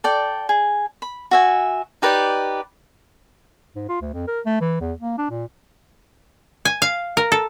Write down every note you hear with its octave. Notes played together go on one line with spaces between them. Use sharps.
A4 D5 G5
G#4
B5
F#4 E5 G#5
D#4 G4 B4 D5
G#2
F4
D2
F2
A#4
A3
E3
E2
A#3
D4
A#2
G#5
F5
A#4
A4